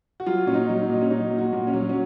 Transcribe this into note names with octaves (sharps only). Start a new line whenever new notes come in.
F#4
F#3 F4
A#2 C#4
D#4
F#3
D#4
A#2
C#4
F#3 D#4
A#2
F#4
A#2
C#4
F#3
C#4